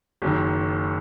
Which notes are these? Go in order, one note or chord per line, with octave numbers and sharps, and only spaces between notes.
F#1 F#2 D#3